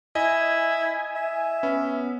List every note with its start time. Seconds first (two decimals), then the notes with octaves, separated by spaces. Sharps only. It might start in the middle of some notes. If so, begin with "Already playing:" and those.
0.15 E4 D#5 G#5
1.16 E5
1.63 B3 C#4